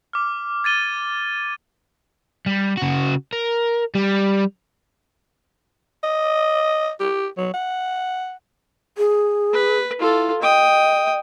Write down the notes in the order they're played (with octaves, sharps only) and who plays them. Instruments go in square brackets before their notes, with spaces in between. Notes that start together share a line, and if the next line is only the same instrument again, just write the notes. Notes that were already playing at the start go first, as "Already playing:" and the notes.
[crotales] D6 F6
G#6 A6 D#7 G7
[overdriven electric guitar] G3
C#3 F#4
A#4
G3
[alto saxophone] D#5
G4
F#3
F#5
[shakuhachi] G#4
[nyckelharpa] B4
[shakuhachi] E4 [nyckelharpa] F4 A4
[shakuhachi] D#5 [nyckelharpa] G5 D#6